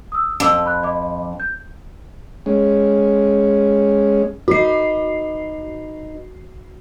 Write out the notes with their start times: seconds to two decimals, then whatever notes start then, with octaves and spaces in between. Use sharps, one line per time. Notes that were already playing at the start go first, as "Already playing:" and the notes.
0.12 D#6 E6
0.40 F2 A5 D6 E6
0.66 B5 F#6
0.83 D#5 B5 D6
1.40 G6
2.46 G#3 C#4
4.48 D#4 F#4 B4 C7